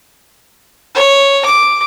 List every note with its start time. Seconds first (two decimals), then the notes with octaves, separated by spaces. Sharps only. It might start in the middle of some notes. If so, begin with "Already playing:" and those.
0.95 C#5
1.46 D6